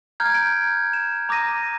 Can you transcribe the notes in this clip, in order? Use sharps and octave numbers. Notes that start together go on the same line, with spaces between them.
A#5 F6 G6 G#6
D7
E7
A#5 D6 D#6 A#6 D#7
A#6